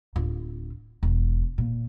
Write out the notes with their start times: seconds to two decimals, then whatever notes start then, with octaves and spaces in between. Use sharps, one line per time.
0.16 D1 F4
1.03 E1
1.58 A#2